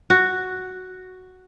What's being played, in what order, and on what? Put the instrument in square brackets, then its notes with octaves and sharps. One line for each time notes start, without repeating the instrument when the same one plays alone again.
[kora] F#4